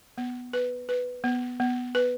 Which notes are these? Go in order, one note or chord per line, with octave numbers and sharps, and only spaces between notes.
B3
B4
B4
B3
B3
B4